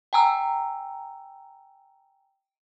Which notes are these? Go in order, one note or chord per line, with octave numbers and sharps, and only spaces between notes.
G5 G#5 A#5 E6